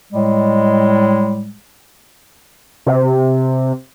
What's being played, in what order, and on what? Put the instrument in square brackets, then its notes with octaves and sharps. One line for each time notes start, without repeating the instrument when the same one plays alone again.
[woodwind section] A2 G3 G#3
[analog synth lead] C3